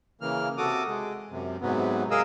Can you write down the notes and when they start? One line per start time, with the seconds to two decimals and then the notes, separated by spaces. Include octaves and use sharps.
0.21 C#3 E3 A#3 F6
0.58 C3 F#4 A4 D6 D#6
0.87 G#3
1.30 F#2 C3
1.61 G#2 C3 F#3 B3
2.11 G#4 A#4 D#5 F5 D#6 E6